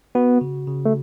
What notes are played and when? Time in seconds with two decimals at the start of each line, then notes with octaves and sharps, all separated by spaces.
0.15 B3 F#4
0.41 C#3
0.68 C#3
0.85 A3